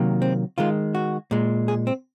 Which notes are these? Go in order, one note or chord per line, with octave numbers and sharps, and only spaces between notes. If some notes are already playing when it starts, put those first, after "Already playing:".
Already playing: C3 D#3 F#3 A#3
C4
D#3 G#3 F4
F#4
A#2 G#3
G#4
C4